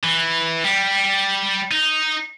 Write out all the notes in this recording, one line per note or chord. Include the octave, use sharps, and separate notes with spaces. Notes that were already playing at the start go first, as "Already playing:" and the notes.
E3
G3
D#4